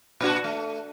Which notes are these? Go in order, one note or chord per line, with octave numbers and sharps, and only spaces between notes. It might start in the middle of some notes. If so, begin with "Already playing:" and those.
A#2 D4 F#4
A3